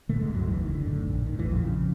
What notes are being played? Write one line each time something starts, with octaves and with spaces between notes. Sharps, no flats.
A2 D3 A3
G#2 G#3
D2
F#2 F#3
F#1 E2 E3
D#3
F#2
D3
A2
A#1
A2 D#3
E2 E3
A#1
F2 F3
C#3